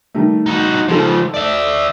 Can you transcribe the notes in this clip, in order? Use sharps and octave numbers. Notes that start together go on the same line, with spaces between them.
D#3 G3 A3
D#4 F#4
C#2 F3 D#4 G4 A4
D5 E5